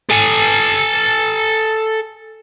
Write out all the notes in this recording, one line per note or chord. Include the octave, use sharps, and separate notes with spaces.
A4 G#5